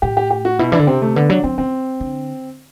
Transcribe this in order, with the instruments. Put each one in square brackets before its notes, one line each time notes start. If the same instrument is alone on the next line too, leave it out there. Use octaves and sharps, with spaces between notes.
[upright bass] A2 [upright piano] G4
[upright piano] G4
G4
F#4
[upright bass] B2 [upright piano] E4
[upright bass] E3 [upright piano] D4
[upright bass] D3
[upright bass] C3 [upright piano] C4
[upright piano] A3
[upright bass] D3 [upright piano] B3
[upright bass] F#3 [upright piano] D4
[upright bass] F#3 [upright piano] C4
[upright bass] E3 [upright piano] C4
[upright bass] D3